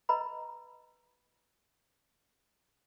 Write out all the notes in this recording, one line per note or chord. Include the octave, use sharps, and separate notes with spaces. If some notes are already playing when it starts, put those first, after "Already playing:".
B4 D#5 A#5 B5